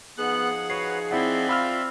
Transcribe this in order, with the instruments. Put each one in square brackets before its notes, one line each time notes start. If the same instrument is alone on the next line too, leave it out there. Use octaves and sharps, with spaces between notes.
[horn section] F3 D#4 G#4 [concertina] B3 F#6 [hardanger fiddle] F#5
[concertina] F#4 B4 C#5 [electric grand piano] C7
[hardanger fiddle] C4 [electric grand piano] E4 F#5 [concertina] D5 E5
[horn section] F4 [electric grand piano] B5 E6 F6